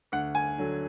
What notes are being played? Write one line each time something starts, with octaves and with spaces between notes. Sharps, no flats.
D2 F#5
G#5
D3 F#3